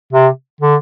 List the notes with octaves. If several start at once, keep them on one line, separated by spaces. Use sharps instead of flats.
C3
D3